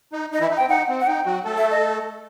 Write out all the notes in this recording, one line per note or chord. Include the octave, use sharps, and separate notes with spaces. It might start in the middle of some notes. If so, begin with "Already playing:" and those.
D#4
D#4 D#5
E3 E4
E5
D#4
C4 G5
D#4 F#5
C4
F#5
D#4 G5
F#3 F#4
A3 A4
E5
D#5